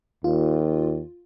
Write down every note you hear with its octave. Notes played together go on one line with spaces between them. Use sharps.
D#2 F4